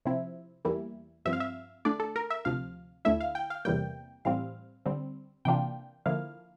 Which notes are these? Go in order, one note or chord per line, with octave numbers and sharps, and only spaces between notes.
C3 F3 C4 E4
E2 E3 G3 A#3 E4
G2 F3 C4 E5
F5
E5
D3 A3 D4 D5
A4
A#4
E5
D2 C3 F3 F5
D2 D3 A3 E4 E5
F5
G5
F5
E2 C3 E3 G3 A#3 G5
A2 E3 G3 C4 F5
D3 G3 C4
C3 E3 A#3 D4 F4 G5
D3 F3 A#3 E4 F5